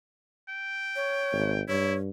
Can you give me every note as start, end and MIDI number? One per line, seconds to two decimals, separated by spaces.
0.49 1.63 79
0.96 1.52 73
1.32 1.61 32
1.68 2.09 43
1.68 1.94 64
1.68 1.97 73